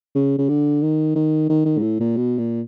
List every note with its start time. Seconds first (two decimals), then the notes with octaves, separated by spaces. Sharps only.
0.15 C#3
0.38 C#3
0.49 D3
0.82 D#3
1.15 D#3
1.49 D#3
1.65 D#3
1.78 G#2
1.82 A2
2.00 A#2
2.17 B2
2.38 A#2